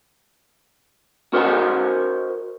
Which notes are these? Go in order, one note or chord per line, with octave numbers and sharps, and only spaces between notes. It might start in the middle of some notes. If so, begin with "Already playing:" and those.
F#4 A#4 C5 D#5 F#5 G#5